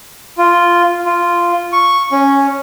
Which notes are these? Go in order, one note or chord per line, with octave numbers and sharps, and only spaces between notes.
F4
F4
C#6
C#4